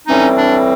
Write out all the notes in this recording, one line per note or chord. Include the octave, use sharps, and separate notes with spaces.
A2 E3 G3 C4 C#4 D#4
D4